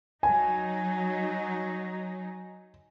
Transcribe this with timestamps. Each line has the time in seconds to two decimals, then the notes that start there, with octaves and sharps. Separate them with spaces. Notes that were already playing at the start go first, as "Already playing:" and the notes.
0.23 F#3 D#4 G#5